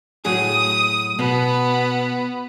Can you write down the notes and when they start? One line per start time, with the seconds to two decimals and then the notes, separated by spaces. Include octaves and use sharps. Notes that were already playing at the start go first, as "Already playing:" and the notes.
0.25 A2 F#3 G#4 D#6
1.19 B2 B3